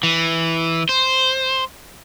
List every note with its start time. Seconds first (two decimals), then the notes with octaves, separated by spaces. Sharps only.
0.03 E3
0.89 C5